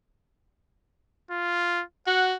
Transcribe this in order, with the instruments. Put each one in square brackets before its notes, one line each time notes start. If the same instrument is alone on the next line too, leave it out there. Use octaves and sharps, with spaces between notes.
[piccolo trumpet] F4
[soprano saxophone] F#4 [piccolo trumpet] F#5